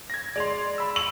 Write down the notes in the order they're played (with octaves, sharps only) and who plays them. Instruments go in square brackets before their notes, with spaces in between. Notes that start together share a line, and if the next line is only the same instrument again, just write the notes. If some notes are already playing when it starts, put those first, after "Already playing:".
[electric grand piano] G#6 A#6
[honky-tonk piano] G#3 F7 [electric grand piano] D5 C6
[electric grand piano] B5 E6
[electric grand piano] C#6 [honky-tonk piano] F#7